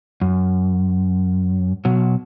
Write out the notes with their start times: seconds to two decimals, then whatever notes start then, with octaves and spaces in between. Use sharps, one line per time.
0.21 F#2
1.85 B2 F#3